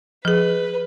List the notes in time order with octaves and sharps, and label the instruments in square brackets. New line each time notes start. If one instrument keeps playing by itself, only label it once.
[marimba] F3 G#4 [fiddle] B4